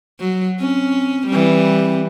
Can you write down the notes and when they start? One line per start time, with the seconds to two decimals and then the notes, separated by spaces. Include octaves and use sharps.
0.20 F#3
0.60 C4 C#4
1.28 E3 G3